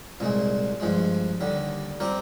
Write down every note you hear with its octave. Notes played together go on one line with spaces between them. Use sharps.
C2 A#2 G#3
G2 F3 G#3
D#2 D3 G3
G3 C4 G4 A#4